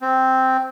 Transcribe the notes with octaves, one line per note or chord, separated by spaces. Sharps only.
C4